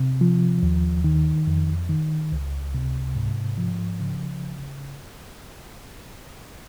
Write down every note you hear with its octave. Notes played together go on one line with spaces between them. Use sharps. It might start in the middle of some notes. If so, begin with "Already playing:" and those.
Already playing: C3
F3
D#2
D#3
F2
D#3
C#2
C3
G#2
F3
C#3